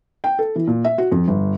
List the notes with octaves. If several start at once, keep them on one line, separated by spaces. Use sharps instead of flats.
G5
A4
E3
A#2
E5
F#4
F2
G1